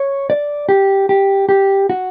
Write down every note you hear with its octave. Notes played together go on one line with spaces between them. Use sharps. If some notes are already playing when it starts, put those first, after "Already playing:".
Already playing: C#5
D5
G4
G4
G4
F#4